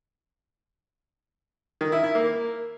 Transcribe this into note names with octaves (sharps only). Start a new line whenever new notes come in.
D#3
E4
E4
A#3